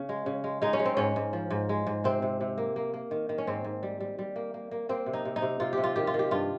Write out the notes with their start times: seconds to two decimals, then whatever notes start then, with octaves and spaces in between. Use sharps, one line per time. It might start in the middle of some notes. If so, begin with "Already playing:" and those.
Already playing: C#3
0.09 G#3
0.26 C#3
0.44 G#3
0.62 G#3 D#4
0.73 C#4
0.79 G#3
0.85 C4
0.97 G#2 C#4
1.16 G#2
1.33 F3
1.50 G#2
1.69 G#3
1.87 G#2
2.04 C3 C4
2.22 C3
2.41 C3
2.58 A#3
2.76 A#3
2.94 A#3
3.11 D#3
3.29 D#3
3.38 C#4
3.47 G#2 C4
3.64 G#2
3.83 G3
4.00 G3
4.19 G3
4.36 A#3
4.54 A#3
4.71 A#3
4.89 A#3 C4
5.06 C3
5.13 D#4
5.25 C3
5.36 D#4
5.42 C3
5.60 C3 F4
5.73 C3 G4
5.84 F4
5.96 D#3 G4
6.07 F4
6.14 D#3
6.19 G4
6.31 G2 F4